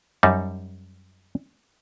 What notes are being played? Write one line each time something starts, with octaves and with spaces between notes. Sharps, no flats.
F#2 G3 D#4